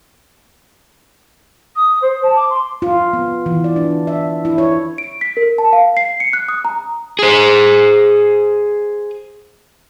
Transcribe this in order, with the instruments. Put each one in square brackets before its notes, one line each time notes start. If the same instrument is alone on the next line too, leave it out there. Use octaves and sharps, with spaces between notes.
[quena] D#6
C5
A5
D6
C6
[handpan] F4
B3
E3
D5
D4
E5
E4
C#5
[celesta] D7
B6
A#4
A5
F5
C7
C#7
F#6
D#6
A#5
[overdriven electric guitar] G#4 C5